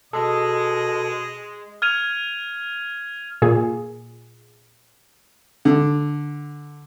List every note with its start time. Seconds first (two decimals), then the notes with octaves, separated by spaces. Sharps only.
0.13 B2 G#3 A4 D#5 D#6
1.82 F6 G#6 D#7 F7
3.42 A#2 G#4
5.65 D3